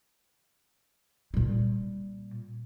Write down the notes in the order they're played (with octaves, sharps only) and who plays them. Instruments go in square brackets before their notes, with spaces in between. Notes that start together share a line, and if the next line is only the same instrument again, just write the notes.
[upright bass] A#2 G3